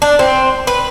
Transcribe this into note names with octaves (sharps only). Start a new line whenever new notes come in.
D4
C4
B4